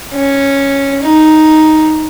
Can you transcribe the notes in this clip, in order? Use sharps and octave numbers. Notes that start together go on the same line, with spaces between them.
C#4
D#4